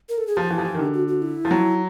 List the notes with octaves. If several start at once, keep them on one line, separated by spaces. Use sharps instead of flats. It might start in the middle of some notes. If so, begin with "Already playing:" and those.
A#4
A4
G#4
F3 G4
E3
F3
E3
D#3
D3
F#4
F#4
E4
F3
F#3